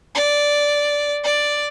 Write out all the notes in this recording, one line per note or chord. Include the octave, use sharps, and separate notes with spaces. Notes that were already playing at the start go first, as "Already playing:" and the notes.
D5
D5